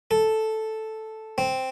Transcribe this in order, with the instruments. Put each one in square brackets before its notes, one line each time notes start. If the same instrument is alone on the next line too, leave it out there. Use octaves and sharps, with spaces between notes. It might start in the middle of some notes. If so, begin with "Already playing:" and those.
[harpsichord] A4
C4